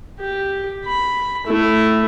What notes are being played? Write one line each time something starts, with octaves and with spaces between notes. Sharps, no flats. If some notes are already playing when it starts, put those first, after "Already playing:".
G4
B5
A3 E4